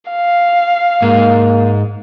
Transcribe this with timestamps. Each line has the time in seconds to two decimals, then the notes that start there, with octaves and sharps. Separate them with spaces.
0.11 F5
1.02 G#2 A#3